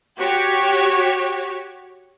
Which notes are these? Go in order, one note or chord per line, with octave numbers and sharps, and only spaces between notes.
F#4 G4 C#5